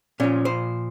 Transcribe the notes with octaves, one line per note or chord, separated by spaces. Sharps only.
A#2 F3 C#4
C5